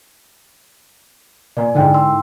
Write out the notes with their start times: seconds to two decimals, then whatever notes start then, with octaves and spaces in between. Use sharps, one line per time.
1.57 A#2 D5 G#5
1.75 G#2 D3 D#4 E4 G5
1.94 C6 E6